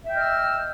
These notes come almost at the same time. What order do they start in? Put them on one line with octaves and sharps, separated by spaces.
E5 G5 D#5 F6 E6